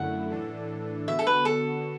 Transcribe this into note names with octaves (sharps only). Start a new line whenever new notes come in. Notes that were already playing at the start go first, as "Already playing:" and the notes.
Already playing: F#2 D3 A3 E4 F#5
A2 E3 D4 A4
D3 B3 F#4 E5
A4
B4
A4